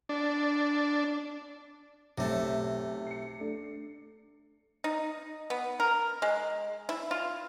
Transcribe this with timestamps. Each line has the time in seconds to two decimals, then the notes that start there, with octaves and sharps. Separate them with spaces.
0.09 D4
2.18 B1 C3 A3
3.07 C7 C#7
3.39 A3 D4
4.84 D#4
5.50 B3
5.80 A#4
6.22 G#3
6.89 E4
7.11 F4